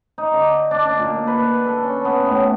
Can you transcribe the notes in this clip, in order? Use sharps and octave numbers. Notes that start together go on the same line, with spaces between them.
D#4
D3
D4
D4
A#2
B4
A4
C#4
B3
A2